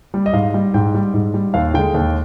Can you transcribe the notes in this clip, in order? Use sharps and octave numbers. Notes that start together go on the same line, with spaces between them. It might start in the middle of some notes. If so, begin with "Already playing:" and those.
G3
D#5
G#2 F5
G3
G#2 G5
G3
G#2
G3
D#2 F5
D3 G#3 G5
D#2